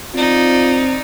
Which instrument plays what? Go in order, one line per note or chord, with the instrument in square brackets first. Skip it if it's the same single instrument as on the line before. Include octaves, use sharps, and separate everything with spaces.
[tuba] C4 [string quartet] D#4 D5 [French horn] F4